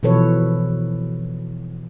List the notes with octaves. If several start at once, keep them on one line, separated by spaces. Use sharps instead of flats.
B2 E3 F3 A4 B4 C#5